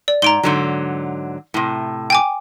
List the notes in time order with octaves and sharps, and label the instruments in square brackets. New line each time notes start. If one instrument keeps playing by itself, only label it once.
[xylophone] D5
[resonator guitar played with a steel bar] G#2 [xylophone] A#5 D7 G7
[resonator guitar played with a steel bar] G#2 D3 F#3
A2 C3
[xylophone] G5 G#5 D6